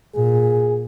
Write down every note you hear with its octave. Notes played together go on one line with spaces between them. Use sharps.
A#2 G#4